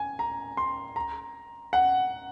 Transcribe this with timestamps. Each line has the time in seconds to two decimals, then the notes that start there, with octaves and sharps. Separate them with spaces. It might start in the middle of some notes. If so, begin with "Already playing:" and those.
Already playing: G#5
0.19 A#5
0.57 C6
0.96 A#5
1.73 F#5